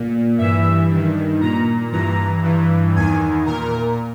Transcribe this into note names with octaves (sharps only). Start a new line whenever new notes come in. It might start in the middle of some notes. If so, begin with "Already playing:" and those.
Already playing: A#2
G2 E3 E5
G2 D#3
A#2 A#5
G2 E3 A#5
G2 E3
E2 D#3 G#5
A#2 A#4